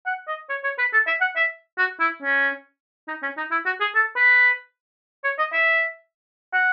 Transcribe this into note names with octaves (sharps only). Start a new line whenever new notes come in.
F#5
D#5
C#5
C#5
B4
A4
E5
F#5
E5
F#4
E4
C#4
D#4
C#4
D#4
E4
F#4
G#4
A4
B4
C#5
D#5
E5
F#5